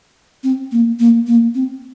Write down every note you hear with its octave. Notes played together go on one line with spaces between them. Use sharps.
C4
A#3
A#3
A#3
C4